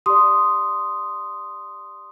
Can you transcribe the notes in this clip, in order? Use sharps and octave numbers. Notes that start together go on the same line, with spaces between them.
G4 D5 C6 D#6